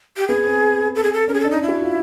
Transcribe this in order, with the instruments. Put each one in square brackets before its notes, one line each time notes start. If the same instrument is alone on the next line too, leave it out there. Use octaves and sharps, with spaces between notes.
[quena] G4
[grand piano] B3 [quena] G#4
[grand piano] C4
[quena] A4
G#4
A4
[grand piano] C#4 [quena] A#4
[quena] G#4
[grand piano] D4 [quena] A4
[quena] D#4
E4
[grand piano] F#4
F4